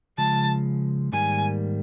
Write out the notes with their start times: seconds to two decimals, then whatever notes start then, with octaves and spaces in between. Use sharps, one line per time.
0.18 C#3 F3 G#3 A5
1.13 G#2 D#3 G3 A#3 G#5